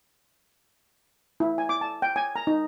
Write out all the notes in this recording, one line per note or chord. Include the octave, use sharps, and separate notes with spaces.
E4
G#5
D6
A5
G5
G#5
A#5
D#4